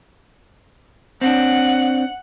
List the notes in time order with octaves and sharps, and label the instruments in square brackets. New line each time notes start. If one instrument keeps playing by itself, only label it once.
[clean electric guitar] C4 D4 [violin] F#5